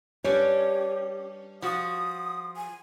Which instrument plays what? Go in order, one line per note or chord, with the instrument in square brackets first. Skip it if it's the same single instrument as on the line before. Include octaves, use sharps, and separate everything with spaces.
[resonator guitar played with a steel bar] G3 C#4 D4 [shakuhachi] G4 [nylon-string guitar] B4 C#5
[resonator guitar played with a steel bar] F3 F#4 [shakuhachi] D#6
[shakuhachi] G#5